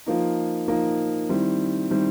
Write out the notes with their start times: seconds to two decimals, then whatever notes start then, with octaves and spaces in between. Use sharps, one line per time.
0.06 F3 A#3 D#4
0.68 F3 A#3 D#4
1.29 D#3 G3 C4 E4
1.90 D#3 G3 C4 E4